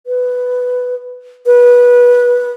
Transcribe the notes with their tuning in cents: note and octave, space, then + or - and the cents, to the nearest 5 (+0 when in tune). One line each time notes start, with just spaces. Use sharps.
B4 +5
B4 -20